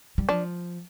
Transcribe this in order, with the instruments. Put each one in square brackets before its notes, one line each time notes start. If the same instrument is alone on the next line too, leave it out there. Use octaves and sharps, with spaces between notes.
[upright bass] G3
[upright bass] F3 [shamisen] D4